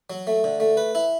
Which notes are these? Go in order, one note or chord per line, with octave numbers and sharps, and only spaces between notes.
F#3
A3
D3
A3
B4
E4